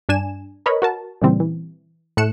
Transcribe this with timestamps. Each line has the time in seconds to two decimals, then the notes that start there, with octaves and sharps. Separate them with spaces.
0.09 G2 D4 G#5 E7
0.66 A#4 B4 C#5 D#5 B5
0.82 F#4 A#4 A5
1.21 A#2 C#3 E3 G3 C4
1.40 E3
2.17 A2 A3 F#6 C#7 E7